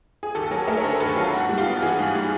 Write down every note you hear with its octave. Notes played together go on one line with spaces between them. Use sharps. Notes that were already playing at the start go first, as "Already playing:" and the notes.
G#4
D#2 G4 A4
F#3 G#4 A#4
A3 G#4 A#4
C#5
D3 A#4 C5
D#2 A4 B4
F#3 F4
G#2 F#4
G3
F4 G4
B3
E3 F#4 G#4
G#2
G3